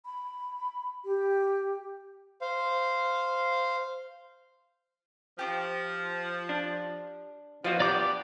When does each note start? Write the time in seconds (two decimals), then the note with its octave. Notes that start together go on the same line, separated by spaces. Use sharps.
0.05 B5
1.05 G4
2.41 C5 F5
5.39 F3 G4 D6
6.49 D4
7.64 B2 F3 A#3 D4 F4 F#4
7.80 B3 G4 D5 A#5 D6 G6